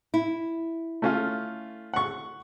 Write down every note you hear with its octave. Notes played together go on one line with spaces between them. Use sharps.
E4
A3 C#4 F4
F#5 C#6